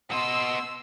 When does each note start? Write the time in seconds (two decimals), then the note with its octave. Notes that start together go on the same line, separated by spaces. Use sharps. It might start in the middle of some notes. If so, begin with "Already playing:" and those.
0.11 B3 D#5 C6 E6